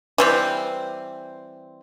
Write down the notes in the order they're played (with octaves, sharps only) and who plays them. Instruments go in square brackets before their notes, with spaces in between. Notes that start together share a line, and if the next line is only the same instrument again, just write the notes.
[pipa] E3 G3 C4